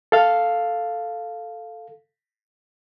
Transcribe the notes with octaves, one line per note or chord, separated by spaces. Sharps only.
A4 F5